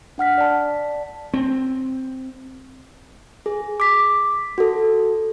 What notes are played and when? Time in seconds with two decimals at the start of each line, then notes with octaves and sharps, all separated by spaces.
0.18 D4 F#5 F6 B6
0.38 D5 A5
1.34 C4
3.46 G#4
3.80 D6 B6
4.58 F#4 A4